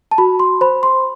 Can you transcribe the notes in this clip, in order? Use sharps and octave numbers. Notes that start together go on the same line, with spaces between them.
A5
F#4 B5
C6
C5 B5
C6